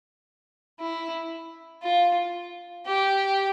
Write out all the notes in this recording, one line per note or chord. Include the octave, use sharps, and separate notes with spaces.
E4
F4
G4